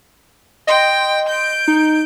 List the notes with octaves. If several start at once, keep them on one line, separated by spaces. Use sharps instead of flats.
D#5 G5 C6
G6 D7
D#4